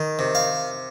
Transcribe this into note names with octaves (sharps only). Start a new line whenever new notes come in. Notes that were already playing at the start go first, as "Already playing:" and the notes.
Already playing: D#3
C3
F5